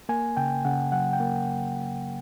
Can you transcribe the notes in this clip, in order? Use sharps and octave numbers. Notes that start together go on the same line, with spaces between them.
A#3 G#5
C#3 G5
C#3 F#5
F#3 F#5
G5
A#3